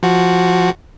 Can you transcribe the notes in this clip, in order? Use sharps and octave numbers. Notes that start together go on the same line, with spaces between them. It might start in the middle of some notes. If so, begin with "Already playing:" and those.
F3 F#4